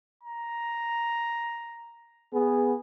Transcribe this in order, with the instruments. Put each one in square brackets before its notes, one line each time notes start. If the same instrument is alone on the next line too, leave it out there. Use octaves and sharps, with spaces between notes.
[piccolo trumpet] A#5
[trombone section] B3 G#4